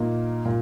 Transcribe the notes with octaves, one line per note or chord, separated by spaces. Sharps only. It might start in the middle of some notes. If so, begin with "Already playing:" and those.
Already playing: A#2 A#3 D#4
A#2